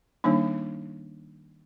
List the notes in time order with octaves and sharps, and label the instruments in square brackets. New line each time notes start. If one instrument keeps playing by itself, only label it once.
[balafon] D#3 G3 A#3 D4 D#4